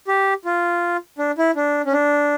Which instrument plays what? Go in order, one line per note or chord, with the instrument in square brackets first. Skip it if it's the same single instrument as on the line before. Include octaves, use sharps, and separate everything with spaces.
[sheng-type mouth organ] G4
F4
D4
E4
D4
C#4
D4